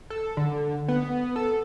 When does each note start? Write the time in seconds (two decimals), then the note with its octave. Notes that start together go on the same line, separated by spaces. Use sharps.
0.10 A4
0.37 D3
0.88 B3
1.36 A4